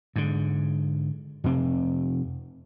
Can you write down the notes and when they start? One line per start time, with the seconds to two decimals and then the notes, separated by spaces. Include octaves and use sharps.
0.16 G#2 D3
1.44 F2 C3 C4